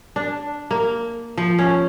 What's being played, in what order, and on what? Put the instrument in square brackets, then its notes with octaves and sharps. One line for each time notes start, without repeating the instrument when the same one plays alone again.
[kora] D4
A#3
F3
C#4